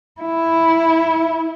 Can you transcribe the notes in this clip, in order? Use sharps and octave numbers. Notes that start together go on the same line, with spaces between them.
E4